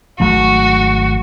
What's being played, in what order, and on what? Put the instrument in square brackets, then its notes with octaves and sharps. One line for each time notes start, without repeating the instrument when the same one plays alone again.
[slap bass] G#1 F#3 A3 [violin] F#4